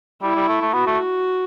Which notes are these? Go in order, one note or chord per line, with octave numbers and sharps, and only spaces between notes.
G3 E4
G3
A3
A3
B3 F#4
A3